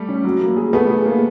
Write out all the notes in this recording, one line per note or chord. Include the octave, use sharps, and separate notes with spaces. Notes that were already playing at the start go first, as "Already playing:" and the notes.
Already playing: G3 A3
C#4
F#3
A#3
G#4
A3 B3 G#4
G#4
A#3